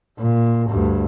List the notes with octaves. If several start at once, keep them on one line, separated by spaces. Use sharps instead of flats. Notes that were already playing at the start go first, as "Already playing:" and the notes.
A#2
D2 G2